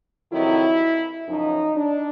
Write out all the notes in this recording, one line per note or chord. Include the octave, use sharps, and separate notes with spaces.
F2 C3 D#3 F#3 E4
F#2 C#3 F3 D#4
D4